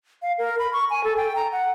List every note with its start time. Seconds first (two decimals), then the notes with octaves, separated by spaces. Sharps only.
0.22 F5
0.38 A#4
0.59 B5
0.73 C#6
0.90 G#5
1.04 A4
1.17 G5
1.36 A#5
1.52 F#5